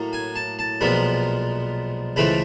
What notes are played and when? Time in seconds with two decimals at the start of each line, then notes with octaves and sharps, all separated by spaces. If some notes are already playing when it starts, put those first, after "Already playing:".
Already playing: A2 F#3 A#3
0.13 G#5
0.36 A5
0.59 A5
0.81 B1 A#2 F3 G#3 B3 B5
2.16 C#2 C#3 E3 A3 C4 B5